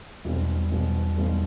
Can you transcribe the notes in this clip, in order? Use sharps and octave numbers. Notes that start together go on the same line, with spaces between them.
B1 E2 B2 G3 C4
B1 B2 G3 C4
B1 B2 G3 C4